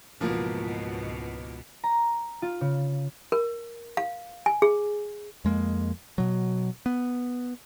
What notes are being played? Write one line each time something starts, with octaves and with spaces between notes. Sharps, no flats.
C#2 G#2 B2 E3 F3 A#3
A#5
F4
C#3
A#4
F5
G#5
G#4
F2 G#3 A#3
B2 F#3
B3